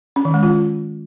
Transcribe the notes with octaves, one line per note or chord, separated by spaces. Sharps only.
C#4
D#3
G#3
F4